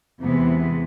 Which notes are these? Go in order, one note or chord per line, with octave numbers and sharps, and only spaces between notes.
E2 C3 E3 G#3 B3